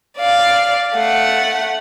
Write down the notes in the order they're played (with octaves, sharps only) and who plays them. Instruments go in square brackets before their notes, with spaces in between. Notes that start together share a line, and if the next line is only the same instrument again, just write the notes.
[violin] D5 F5
A3 F#5